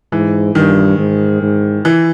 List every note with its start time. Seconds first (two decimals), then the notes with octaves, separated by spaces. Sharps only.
0.12 G#2 E3
0.55 G2 D#3
0.99 G#2
1.42 G#2
1.85 E3